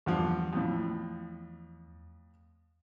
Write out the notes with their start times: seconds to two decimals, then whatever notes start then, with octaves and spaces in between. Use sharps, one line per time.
0.06 E2 G2 D3 F3
0.53 F2 A2